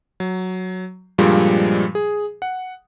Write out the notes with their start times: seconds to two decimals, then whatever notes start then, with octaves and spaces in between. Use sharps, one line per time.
0.20 F#3
1.18 G2 A#2 F3 G3 G#3
1.95 G#4
2.42 F#5